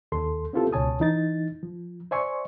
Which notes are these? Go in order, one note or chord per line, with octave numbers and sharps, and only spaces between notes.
D#2 A4 C6
B3 C4 E4 F4 G4 A4
C#2 B2 C#5 G#5 A5 D#6
E3 D#4 A6
F3
C5 D5 E5 G#5 C6 C#6